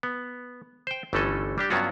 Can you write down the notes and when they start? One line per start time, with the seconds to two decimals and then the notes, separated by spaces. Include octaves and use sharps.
0.03 B3
0.87 C5 G5
1.13 G1 E3 A3 C#4 A4 D#5
1.58 G3 D4 G4
1.70 G2 F#3 B3 C#4 F4 F#4